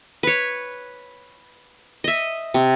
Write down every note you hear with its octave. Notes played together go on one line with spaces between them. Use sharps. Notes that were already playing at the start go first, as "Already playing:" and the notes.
B4 C#5
D#5 E5
C3